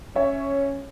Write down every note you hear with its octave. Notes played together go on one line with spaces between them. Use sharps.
C#4 C#5 E5